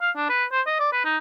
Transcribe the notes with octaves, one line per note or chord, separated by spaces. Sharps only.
F5
D4
B4
C5
D#5
D5
B4
D#4